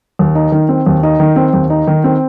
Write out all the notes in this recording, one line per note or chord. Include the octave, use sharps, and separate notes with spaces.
D#2
D#4
D#3
C4
D#2
D#4
D#3
C4
D#2
D#4
D#3
C4